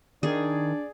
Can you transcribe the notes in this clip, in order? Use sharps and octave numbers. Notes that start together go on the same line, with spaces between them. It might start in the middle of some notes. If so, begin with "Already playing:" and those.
D#3 D4 G#4 D5